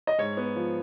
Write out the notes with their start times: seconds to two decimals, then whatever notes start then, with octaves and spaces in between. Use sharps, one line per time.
0.07 D#5
0.18 G#2 C#5
0.37 B3
0.56 F3